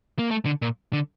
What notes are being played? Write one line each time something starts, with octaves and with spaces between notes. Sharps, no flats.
A#3
A3
D3
A#2
D3